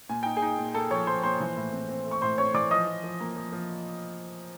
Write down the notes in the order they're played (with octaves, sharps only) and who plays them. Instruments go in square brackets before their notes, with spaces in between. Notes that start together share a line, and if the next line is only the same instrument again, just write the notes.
[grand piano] A#2 G#5
D#4 G5
G#4 G#5
D#4
A#2
A#3 A4 A5
F3 C#5 C#6
F3 C5 C6
A#2 C5 C6
E3
A2
C4
C4
A3
C#6
A2 C5 C6
C4 C#5 C#6
E3 D5 D6
F3 D#5 D#6
F3
F3
A#3
F3
F3